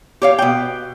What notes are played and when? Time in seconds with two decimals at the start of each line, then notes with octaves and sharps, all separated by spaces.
0.22 G4 C#5 F5
0.38 B2 G5